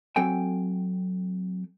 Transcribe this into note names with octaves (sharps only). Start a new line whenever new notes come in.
F#3 C4 A4 G5 G#5